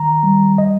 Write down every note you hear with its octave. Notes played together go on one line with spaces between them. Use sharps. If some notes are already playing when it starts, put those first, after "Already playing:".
Already playing: D#3 A#5
G3
D#5